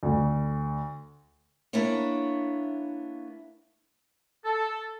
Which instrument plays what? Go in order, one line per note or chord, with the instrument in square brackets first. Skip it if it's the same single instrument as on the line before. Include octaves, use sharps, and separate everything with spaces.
[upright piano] D2
[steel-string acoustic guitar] A#3 B3 D4 E4 C#5
[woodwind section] A4